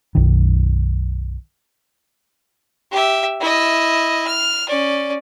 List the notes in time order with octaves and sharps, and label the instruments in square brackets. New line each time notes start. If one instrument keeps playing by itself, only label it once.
[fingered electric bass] B1 F#2 D#3
[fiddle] G4 E5
E4 D#5
F6
C#4 D5